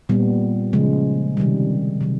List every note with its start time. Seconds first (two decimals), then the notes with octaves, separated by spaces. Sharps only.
0.09 A#2 G3 B3
0.73 C#3 F3 G#3
1.37 C3 D#3 G3
2.01 C3 D#3 F#3